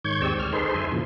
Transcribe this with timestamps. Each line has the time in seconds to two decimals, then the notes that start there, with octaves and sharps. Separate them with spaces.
0.04 G#2 D#3 C#5 C#6 G6 G#6
0.22 D#2 G#3 C4 G4 D5 E6
0.39 D2 F6
0.53 D#4 G#4 A4 B4 C5 C6
0.74 F#2 E5 G#5 C6
0.92 A#2 C#3 E3 F3